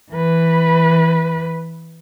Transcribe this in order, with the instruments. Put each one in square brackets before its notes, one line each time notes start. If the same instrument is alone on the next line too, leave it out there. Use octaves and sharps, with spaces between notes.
[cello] E3 B4